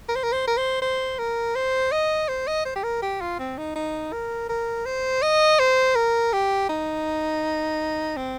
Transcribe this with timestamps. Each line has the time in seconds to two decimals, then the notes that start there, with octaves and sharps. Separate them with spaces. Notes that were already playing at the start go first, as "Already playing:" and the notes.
0.09 A#4
0.16 C5
0.23 A#4
0.32 C5
0.47 A#4
0.57 C5
0.82 C5
1.19 A#4
1.56 C5
1.92 D#5
2.29 C5
2.47 D#5
2.65 C5
2.76 G4
2.83 A#4
3.02 G4
3.21 F4
3.39 C4
3.58 D#4
3.76 D#4
4.13 A#4
4.49 A#4
4.86 C5
5.22 D#5
5.60 C5
5.96 A#4
6.33 G4
6.69 D#4
8.17 C4